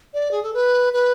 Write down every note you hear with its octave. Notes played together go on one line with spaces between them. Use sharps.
D5
G#4
A4
B4
B4